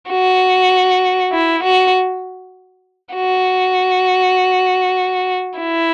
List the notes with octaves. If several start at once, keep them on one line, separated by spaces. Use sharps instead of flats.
F#4
E4
F#4
F#4
E4